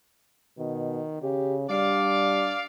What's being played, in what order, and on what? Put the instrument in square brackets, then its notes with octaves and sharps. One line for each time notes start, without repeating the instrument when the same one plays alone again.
[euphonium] B2 [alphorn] D#3
[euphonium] C#3 [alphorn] G4
[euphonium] G3 [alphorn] D4 [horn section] D5 F5